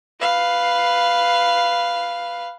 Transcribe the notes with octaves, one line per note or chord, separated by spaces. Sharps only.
B4 F5